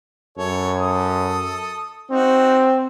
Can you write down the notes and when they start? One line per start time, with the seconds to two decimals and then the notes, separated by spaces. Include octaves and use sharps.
0.38 F#2 A4 C#5
0.80 A4 D#6
2.11 C4 D#4 F#4